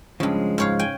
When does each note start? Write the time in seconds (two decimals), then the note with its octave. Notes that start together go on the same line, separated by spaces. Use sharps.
0.20 G2 C#3 F3 G#3
0.58 G#2 C#5 F5
0.79 G5 G#5